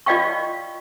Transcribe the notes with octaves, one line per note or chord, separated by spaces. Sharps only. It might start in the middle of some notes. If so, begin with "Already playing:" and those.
F4 D5 D#5 F5 G5 C#6